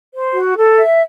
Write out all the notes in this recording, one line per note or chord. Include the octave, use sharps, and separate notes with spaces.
C5
F#4
A4
E5